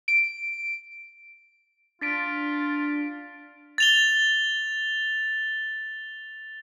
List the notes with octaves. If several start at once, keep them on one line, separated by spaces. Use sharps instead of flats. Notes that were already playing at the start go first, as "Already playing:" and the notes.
D7
D4 F4 A6 B6 D7
A6 F7 G7